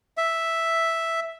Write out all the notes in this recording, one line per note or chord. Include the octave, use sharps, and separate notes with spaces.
E5